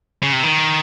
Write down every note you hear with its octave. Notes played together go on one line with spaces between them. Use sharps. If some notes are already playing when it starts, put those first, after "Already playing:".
C#3
C3
D#3